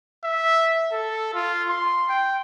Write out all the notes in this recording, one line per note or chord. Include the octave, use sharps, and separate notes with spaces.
E5
A4
F4
C6
G5